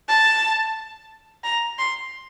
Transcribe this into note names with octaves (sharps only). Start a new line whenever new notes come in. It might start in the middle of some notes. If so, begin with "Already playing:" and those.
A5
A#5
C6